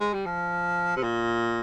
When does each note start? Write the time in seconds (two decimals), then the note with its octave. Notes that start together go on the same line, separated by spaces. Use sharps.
0.01 G#3
0.14 G3
0.26 F3
0.96 C3
1.03 A#2